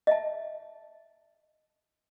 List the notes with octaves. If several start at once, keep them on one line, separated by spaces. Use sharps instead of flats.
D#5 E5 A5